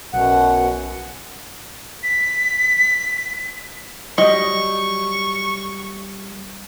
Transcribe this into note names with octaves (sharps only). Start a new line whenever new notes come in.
B1 F#2 B2 F#5
B6
F#3 G3 D#5 C#6